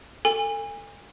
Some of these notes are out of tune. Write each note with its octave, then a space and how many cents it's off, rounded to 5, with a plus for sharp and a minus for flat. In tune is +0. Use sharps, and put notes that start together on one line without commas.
A4 +25 G#5 -30